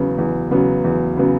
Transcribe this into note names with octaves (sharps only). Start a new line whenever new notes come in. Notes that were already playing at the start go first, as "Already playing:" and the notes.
Already playing: E2 C#3 F#3 B3
E2
C#3 F#3 B3
E2
C#3 F#3 B3